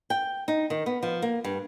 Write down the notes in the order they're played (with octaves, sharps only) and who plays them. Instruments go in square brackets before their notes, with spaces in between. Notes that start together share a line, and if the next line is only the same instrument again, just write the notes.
[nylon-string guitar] G5
D#4
D#3
B3
F3
A#3
G2